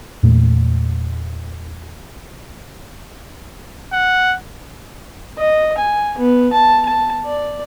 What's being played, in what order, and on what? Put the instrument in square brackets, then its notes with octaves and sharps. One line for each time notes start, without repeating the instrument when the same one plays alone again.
[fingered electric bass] E2 A#2 A3
[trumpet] F#5
[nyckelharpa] D#5
G#5
B3
A5
A5
D5